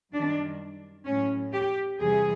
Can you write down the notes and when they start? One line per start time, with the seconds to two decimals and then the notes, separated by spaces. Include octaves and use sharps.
0.12 F#2 D#3 G3 D4
1.05 A2 F#3 C#4
1.53 G4
1.99 E2 C3 E3 G3 G#4